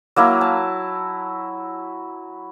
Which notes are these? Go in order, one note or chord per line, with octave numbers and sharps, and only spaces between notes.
F#3 A#3 E4
A5